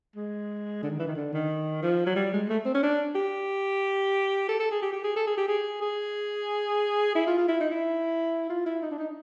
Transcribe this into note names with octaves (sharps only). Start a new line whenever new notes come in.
G#3
D3
D#3
E3
D#3
D3
D#3
F3
F#3
G3
G#3
A3
C4
C#4
D4
G4
A4
A4
G#4
G4
G4
G#4
A4
G#4
G4
G#4
G#4
E4
F4
F4
E4
D#4
E4
F4
E4
D#4
D4
D#4